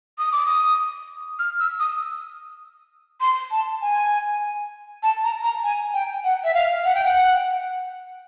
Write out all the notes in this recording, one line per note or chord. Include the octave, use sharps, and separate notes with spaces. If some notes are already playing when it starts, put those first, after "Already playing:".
D#6
D6
D#6
F6
E6
D#6
C6
A5
G#5
A5
A#5
A#5
G#5
G5
F#5
E5
F5
F#5
G5
F#5